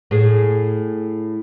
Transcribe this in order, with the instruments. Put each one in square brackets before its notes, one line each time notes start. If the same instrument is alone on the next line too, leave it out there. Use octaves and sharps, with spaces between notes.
[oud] A2 G#4